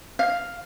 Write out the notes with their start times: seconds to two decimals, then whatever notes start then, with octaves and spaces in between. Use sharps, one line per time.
0.19 F5